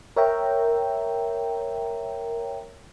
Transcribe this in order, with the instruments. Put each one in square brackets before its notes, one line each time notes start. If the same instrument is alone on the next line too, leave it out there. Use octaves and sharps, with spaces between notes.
[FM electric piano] A#4 C#5 E5 G5 A#5